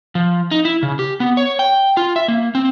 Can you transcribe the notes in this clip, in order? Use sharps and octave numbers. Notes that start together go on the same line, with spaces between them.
F3
D#4
E4
C#3
G4
B3
C#5
G5
F4
E5
A#3
C4